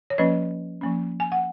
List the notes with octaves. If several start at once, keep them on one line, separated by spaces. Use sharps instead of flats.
C#5
F3 A#3 C#4 B4 D#5
F3 A#3 C#4
G#5
F#5